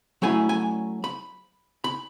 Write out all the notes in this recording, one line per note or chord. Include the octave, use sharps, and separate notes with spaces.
F#3 A3 C#4 E4 G#5
G#5
B5
B5